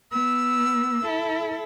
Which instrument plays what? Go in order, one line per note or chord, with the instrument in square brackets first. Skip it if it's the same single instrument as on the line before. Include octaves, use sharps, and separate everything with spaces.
[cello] B3 [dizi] E6
[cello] E4 A4